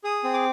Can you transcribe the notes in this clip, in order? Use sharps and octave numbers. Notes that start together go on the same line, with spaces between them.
G#4 D#6
C4
D6